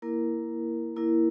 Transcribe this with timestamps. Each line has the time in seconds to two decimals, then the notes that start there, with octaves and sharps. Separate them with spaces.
0.02 A#3 E4 A#4
0.96 A#3 E4 A#4